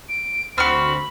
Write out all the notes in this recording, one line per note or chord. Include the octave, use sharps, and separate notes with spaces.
D7
D2 C4 F#4 B5 F6